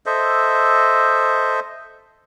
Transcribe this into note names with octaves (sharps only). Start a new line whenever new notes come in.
A4 C5 D#5 E5